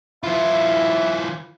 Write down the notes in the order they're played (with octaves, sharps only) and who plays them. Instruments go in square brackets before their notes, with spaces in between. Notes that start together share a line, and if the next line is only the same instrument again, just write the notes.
[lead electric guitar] E3 F4 [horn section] E4 E5